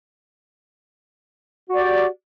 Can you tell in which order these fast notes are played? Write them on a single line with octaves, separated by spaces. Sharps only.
F#4 D5 G4